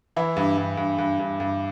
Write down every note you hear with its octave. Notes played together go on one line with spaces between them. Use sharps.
E3 E4
G2
G2
G2
G2
G2
G2